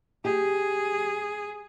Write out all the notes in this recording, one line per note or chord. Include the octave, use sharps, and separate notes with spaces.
G4 G#4